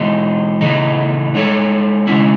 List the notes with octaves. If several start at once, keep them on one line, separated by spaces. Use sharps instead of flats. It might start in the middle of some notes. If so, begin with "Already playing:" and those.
Already playing: E3 G#3 D#4
C#3 E3 A3 D#4 G#4
G#3 D#4 A4 C#5
C#3 G#3 C#4 E4